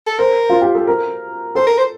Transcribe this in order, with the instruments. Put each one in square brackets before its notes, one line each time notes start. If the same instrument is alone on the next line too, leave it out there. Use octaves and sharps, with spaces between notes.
[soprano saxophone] A4
[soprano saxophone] A#4 [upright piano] C5
[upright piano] F4
G4
A4
A#4
[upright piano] A4 [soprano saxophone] C5
[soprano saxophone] A#4
C5